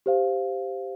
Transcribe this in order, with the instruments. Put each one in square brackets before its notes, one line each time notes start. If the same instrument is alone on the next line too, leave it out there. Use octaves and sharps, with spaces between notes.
[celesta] G4 C5 F5